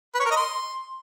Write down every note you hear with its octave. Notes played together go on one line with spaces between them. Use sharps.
B4
C#5
A#4
D#5
C6